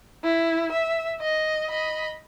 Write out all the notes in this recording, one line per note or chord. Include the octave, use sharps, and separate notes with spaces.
E4
E5
D#5
D#5 B5